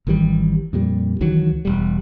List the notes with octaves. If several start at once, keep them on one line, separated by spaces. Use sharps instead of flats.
G#1 D#3 E3 G3
F2 A#2 G3
C#2 D#3 E3 F#3
E1 G3